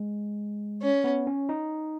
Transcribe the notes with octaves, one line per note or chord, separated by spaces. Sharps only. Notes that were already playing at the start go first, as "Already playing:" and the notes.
Already playing: G#3
C#4
B3
C#4
D#4